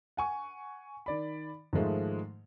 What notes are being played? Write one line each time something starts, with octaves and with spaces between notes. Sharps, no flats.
F#5 G#5 C#6
D#3 D5 B5
G#2 D#3 F3 G#3 A3 D#4